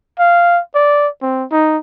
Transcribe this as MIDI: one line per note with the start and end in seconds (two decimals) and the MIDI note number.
0.19 0.60 77
0.75 1.08 74
1.22 1.44 60
1.51 1.77 63